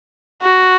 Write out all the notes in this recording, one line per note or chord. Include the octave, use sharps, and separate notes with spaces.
F#4